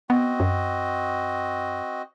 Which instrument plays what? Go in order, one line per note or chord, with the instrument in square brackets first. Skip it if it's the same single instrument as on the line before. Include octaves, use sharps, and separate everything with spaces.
[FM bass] B3 [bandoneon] C4 F#4 D#5
[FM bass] F#2